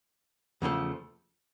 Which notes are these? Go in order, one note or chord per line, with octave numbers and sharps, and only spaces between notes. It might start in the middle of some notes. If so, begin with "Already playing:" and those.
E2 C#3 F3 A3